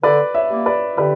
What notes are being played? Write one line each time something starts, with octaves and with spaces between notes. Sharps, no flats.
D3 B4 D5
C#5 E5
G3 A#3
B4 D5
D3 G4 B4